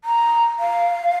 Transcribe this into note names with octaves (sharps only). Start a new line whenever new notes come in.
A#5
F5